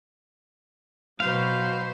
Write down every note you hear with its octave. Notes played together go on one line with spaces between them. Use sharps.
B2 F#3 B4 C5 F5